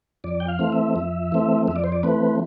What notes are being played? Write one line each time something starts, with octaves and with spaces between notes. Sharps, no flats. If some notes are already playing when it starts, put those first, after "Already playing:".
F2 D5
G5
F5
E3 A3 C4
E5
F2
E3 A3 C4
F2 E5
D5
C5
D5
E3 A3 C4 B4